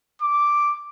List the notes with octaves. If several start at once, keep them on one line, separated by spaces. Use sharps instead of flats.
D6